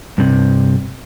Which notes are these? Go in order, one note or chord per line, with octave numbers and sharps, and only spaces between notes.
G2 C3